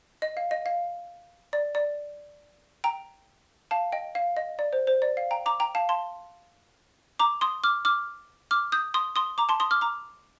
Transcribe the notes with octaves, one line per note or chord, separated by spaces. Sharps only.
D#5
F5
D#5
F5
D5
D5
G5 A#5
F5 A5
D#5 G5
F5
D#5
D5
C5
C5
D5
F5
G5 A#5
A#5 D6
G5 A#5
F5 A5
A5 C6
A#5 D6
C6 D#6
D6 F6
D6 F6
D6 F6
D#6 G6
C6 D#6
C6 D#6
A#5 D6
A5 C6
C6 D#6
D6 F6
A#5 D6